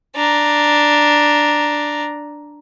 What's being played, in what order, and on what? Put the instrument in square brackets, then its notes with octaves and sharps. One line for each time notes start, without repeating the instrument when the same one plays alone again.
[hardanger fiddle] D4 A#5